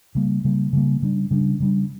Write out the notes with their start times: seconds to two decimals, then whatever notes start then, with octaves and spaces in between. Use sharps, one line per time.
0.15 C#3 G3 A#3
0.45 C#3 G3 A#3
0.73 C#3 G3 A#3
1.02 C#3 G3 D4
1.31 C#3 G3 D4
1.60 C#3 G3 D4